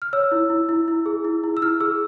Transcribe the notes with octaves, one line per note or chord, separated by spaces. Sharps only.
F6
C#5 E6
E4
E4
E4
E4
G#4
E4
E4
E6
E4 F6
G#4 E6